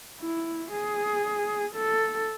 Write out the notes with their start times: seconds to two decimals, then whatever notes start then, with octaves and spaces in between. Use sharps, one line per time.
0.20 E4
0.72 G#4
1.75 A4